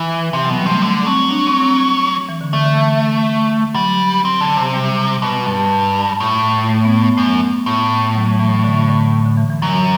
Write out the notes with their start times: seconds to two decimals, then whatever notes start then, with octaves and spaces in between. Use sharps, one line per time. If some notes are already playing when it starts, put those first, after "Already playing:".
Already playing: E3
0.33 C3 E3
0.45 F#3
0.50 B2
0.58 G3
0.66 C3 A3
0.82 D3
1.06 F#3 C4
1.31 D4
1.47 C4
1.64 C4
2.29 E3
2.41 D3
2.53 D3 A3
2.65 D3
2.78 E3
3.75 F#3 G3
4.25 C4
4.41 D3
4.57 C3
4.74 G3
5.22 B2
5.46 G2
6.20 A2
6.69 A3
6.85 B3
7.01 B3
7.17 F#2 A3
7.66 A2
8.15 F#3
8.40 E3
8.64 D3
8.89 D3
9.26 D3
9.38 E3
9.50 E3
9.62 F#2 F#3